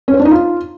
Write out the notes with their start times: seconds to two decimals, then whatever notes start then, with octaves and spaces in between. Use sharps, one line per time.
0.08 C#4
0.14 C5
0.20 D4
0.25 D#4
0.31 F4